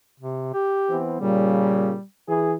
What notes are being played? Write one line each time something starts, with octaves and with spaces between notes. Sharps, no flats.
C3
G4
E3 B3 C4
A#2 C#3 G3
E3 G#4